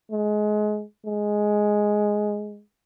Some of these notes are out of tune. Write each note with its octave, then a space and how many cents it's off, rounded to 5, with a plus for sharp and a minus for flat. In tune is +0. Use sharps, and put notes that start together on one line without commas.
G#3 +25
G#3 +5